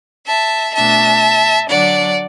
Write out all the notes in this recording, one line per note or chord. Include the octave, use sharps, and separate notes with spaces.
E5 A5
B2 A3 D4 E5 A5
D3 F#3 D4 D5 F#5